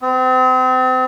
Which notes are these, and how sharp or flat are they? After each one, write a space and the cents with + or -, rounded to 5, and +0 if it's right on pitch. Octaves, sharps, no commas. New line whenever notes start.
C4 -35